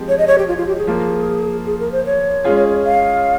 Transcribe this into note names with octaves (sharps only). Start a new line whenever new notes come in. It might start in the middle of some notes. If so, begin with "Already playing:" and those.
Already playing: F3 G#3 C4 G4
C#5
D#5
C#5
G4
F4
F4
G4
G#4
F3 A#3 F4
G#4
A#4
C5
C#5
G#3 C#4 F4 G#4
F5